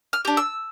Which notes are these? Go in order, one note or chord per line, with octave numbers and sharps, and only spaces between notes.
F6
D4 G4
E6